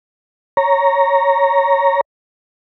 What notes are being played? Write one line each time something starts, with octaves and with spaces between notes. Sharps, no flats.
C#5 A#5